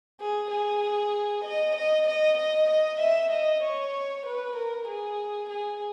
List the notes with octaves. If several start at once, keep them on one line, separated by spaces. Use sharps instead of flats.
G#4
G#4
D#5
D#5
D#5
D#5
D#5
E5
D#5
C#5
B4
A#4
G#4
G#4